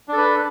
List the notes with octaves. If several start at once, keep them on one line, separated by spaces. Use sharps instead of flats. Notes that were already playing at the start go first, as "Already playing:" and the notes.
D4 A4 B4